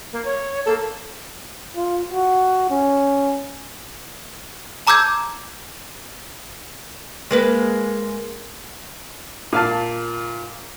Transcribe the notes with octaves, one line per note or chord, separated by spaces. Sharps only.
A#3
C#5
A#3 A4
F4
F#4
C#4
A5 A#5 D6 E6 G6 G#6
G#3 A#3 B4
A#2 F5 A5